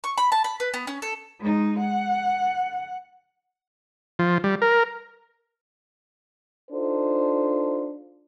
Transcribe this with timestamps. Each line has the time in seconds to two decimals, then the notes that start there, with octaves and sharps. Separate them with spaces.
0.04 C#6
0.18 B5
0.32 A5
0.44 B5
0.60 B4
0.74 B3
0.87 C#4
1.02 A4
1.40 G#3 D#4
1.80 F#5
4.19 F3
4.44 G3
4.62 A#4
6.71 D4 D#4 F4 A4 C5